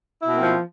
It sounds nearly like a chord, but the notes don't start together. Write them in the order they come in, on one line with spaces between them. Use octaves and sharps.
E4 B2 A#3 C4 F3